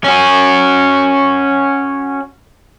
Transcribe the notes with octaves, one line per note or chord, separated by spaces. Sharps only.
C#4 F#4